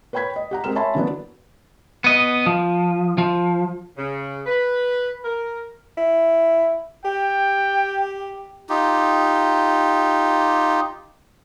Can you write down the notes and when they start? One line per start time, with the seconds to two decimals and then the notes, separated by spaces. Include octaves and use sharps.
0.13 B4 C#5 G5 B5 G#6 B6
0.36 D#5
0.51 G4 F#5 A#5
0.64 G#3 C4 G4 A#4 F6 E7
0.75 C#5 E5 G#5 A5 B5 C6
0.95 D3 E3 F#3 A#3 B3 D4
2.04 B3 D#5
2.46 F3
3.18 F3
3.97 C#3
4.46 B4
5.24 A#4
5.97 E4
7.05 G4 G5
8.69 D#4 F4 G4